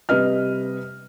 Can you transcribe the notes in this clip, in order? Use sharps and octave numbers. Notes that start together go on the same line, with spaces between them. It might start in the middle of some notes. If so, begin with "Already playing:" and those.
C3 G3 B4 D#5 F6